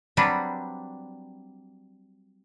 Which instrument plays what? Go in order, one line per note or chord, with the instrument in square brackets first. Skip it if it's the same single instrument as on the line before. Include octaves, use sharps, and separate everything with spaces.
[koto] F#3 G3 C4 D4 B4